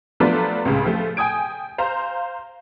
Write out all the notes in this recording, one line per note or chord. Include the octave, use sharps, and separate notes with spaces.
F3 F#3 A3 B3 D4 F4
C#2 A2 C#3
F3 A3
G5 G#5 D#6 G#6 D7
C5 F5 A#5